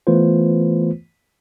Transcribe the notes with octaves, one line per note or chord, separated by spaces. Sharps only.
E3 A3 B3 F4 B4 C5